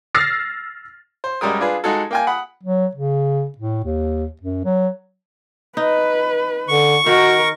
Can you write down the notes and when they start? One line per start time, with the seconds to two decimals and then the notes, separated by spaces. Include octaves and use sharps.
0.15 E6 F6 A6 A#6 C7
1.24 C5
1.41 F#2 G3 G#3 A#4 D#6
1.60 D4 F4 G#4 B4
1.84 G#3 D#4 F#4 G#4 A4
2.11 A#3 G5 G#5
2.27 F#5 B5 D#6
2.63 F#3
2.95 C#3
3.58 A2
3.84 D#2
4.41 F#2
4.65 F#3
5.77 D#4 B4
6.68 D3 C#6
7.06 D#3 F#4 A#4